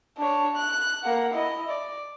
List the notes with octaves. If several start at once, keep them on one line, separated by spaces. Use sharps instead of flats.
D4 C#5
F#6
A#3 F#5
E4 D#5
D5